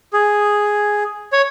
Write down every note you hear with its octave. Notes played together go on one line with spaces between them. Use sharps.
G#4
C#5